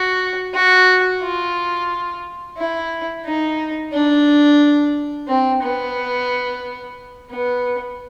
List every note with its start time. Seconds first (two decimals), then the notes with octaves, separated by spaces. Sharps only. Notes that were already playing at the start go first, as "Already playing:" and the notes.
Already playing: F#4
0.54 F#4
1.22 F4
2.57 E4
3.25 D#4
3.93 D4
5.28 C4
5.62 B3
7.30 B3